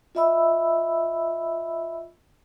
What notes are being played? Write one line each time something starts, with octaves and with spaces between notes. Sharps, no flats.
F4 D#5 E5 B5 E6